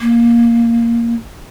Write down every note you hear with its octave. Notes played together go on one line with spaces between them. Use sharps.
A#3